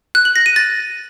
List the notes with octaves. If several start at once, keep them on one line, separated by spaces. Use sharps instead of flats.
F#6
F#7
A#6
D#7
A6